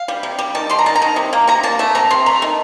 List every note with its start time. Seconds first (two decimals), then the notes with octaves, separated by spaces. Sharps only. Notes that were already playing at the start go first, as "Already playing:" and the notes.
Already playing: F5
0.08 G3
0.23 C3
0.39 G3
0.55 D#3 A5
0.70 G3 C6
0.79 A#5
0.86 D#3 A5
0.96 A#5
1.02 D#3
1.16 C3
1.33 A#3
1.47 C3 A#5
1.63 A#3 A5
1.79 A3 A5
1.95 C3 A#5
2.10 C3 C6
2.26 A3 A#5
2.42 D#3